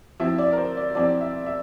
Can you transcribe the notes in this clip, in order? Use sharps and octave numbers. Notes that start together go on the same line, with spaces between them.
F3 C4 E4 E5
D5
A#4
C5
D5
F3 C4 E4 D5
E5
E5